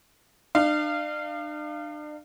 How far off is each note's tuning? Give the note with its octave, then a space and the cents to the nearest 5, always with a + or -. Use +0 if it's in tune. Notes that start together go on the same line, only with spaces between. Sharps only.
D4 +40 F5 -20